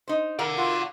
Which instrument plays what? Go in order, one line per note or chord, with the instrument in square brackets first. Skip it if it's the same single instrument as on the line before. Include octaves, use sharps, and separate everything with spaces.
[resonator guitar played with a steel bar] D#4 C5
[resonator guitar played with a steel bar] E4 A#4 F5 [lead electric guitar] D5 F#5
[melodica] F4 F#4